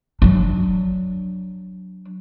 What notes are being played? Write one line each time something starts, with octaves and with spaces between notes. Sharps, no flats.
F#3 D4